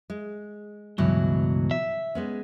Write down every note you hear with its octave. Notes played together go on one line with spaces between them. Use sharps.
G#3
C#2 G2 B2 E3 F#3
E5
G#3 B3 C#4